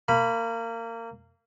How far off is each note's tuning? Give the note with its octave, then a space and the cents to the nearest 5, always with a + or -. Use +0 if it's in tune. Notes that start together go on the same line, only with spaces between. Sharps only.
A#3 -25 B5 +0